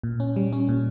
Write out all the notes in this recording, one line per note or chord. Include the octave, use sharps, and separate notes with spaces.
A#2
C#4
G3
C#4
A#2